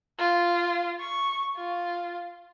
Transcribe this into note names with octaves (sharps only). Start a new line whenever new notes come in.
F4
C#6
F4